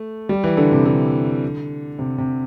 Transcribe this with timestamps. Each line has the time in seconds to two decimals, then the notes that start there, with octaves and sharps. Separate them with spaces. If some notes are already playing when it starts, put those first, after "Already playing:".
Already playing: A3
0.29 G3
0.44 E3
0.57 D3
0.71 C3
0.85 D3
1.99 C3
2.18 C3